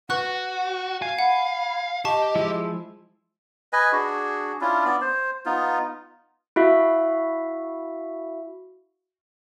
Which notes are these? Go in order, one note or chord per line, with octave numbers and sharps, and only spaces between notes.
F#4 B4 F#5 C#6 F#6
F5 G#5
F#5 B5
G4 D#5 A5 C#6
F3 G#3 E4
B4 D#5 G#5
D4 F#4 G#4
C#4 D4 E4 F4
B3 D5
C5
B3 D#4 F4
E4 F#4 E5 F5